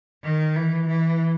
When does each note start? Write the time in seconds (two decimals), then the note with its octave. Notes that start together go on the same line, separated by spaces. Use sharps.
0.23 D#3
0.56 E3
0.88 E3